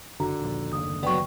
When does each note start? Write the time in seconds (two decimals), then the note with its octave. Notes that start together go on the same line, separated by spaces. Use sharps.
0.20 F#1 D3 F#4 A#5
0.40 D#1 A#1
0.73 F#1 D#2 D#6
1.03 F#3 B3 D5 G5 C#6